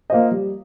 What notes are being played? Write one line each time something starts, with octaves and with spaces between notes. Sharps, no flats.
A#3 F4 C5 D#5
G3